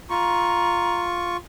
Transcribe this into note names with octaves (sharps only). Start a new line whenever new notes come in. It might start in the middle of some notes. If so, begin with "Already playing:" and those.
F4 A#5 C#6